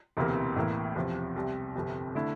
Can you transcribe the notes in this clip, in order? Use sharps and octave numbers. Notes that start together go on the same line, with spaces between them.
E1 D2 C3 E3 A#3
A1 A2 E3 A#3 E4
E1 E2 C3 F3
C2 C3 G3
G1 F2 C3
D3 A3 E4